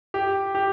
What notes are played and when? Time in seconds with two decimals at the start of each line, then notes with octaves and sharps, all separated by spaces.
0.14 G4
0.55 G4